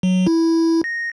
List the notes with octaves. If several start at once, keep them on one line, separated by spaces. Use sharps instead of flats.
F#3
E4
A#6